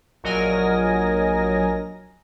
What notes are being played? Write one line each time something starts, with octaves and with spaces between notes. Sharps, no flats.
A#1 F#3 A#4 D#5 G#5 A#6